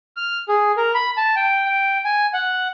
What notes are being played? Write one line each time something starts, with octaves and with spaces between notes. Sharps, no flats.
F6
G#4
A#4
B5
A5
G5
G5
G#5
F#5